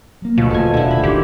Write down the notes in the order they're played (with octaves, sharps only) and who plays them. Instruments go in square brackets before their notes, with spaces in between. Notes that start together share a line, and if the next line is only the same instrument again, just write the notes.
[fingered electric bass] F#3 A#3
[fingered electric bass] D2 [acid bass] B2 [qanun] F3
[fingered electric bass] D#1 A3 [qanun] A4 G#5
[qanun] D3 E4
B5
[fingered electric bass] G#1 E2 D3 [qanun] D#3 C5 [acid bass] G4